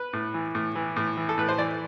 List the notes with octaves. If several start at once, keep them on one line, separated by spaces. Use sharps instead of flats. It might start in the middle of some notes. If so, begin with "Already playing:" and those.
Already playing: B4
A2
E3
A2
E3
A2
E3
A4
A2 B4
C5
E3 D5